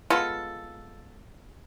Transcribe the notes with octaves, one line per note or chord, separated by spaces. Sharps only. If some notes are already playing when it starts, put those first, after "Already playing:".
G#3 B3 F4 A4